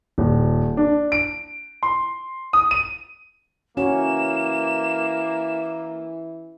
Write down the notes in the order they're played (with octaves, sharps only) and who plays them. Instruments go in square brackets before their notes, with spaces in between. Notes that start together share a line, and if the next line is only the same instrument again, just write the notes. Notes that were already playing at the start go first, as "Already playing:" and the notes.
[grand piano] D#1
D4
D7
C6
D#6
D#7
[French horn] E3 [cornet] A#3 [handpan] C#4 F#4 C#5 [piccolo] E7